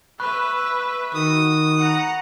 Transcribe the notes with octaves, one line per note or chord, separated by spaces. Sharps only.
B4 E5 B5 C#6 F#6
D#3 F#4 D#6
F#5 A#5